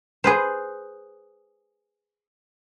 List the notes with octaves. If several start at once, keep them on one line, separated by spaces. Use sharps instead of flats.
G#4 B4 C5